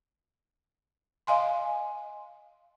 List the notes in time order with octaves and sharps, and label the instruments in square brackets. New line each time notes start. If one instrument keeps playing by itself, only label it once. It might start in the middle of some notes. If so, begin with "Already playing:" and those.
[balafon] D#5 F5 G#5 C6